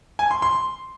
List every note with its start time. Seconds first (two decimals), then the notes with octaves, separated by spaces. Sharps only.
0.19 G#5
0.31 C6
0.42 C6